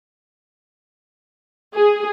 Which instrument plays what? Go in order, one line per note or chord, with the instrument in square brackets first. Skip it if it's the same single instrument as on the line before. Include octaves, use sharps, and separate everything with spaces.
[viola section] G#4